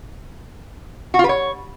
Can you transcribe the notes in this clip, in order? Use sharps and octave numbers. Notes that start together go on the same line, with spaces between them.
F#4
F4
B4
C#5